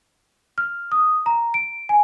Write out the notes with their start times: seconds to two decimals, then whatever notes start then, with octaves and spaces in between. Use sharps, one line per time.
0.58 F6
0.92 D#6
1.26 A#5
1.54 D7
1.89 G#5